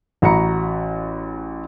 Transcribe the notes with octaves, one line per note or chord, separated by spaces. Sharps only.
A1 F#4 A#5 B5 C#7